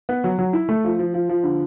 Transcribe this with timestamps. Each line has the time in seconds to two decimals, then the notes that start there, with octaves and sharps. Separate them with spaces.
0.09 B3
0.24 F#3
0.39 F#3
0.53 E4
0.69 A3
0.84 F3
0.99 F3
1.14 F3
1.29 F3
1.44 D3